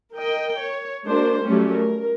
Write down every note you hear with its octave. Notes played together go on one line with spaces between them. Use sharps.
A#4 D#5 G5
C#5
G#3 A#3 D4 F#4 C5
F#3 G3 A3 C#4 G4
A#4